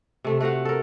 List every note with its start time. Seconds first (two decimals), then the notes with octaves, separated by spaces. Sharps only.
0.24 C3 A3
0.40 A3 F#4 F5 F#5
0.65 A4 A#4